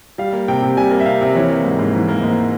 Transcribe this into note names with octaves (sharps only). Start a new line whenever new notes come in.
G3 F5
A#3
C3 G5
C3
G3 G#5
A#3
E5
C3 F5
C3
E3 C#5
A#3
G#2
G#2
E3
A#3
G#2